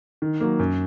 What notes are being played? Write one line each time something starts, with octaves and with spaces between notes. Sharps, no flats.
D#3
F#3 A#3
F#2